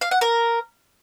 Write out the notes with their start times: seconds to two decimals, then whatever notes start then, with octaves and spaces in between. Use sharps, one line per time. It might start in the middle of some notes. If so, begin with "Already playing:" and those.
0.01 F5
0.11 F#5
0.21 A#4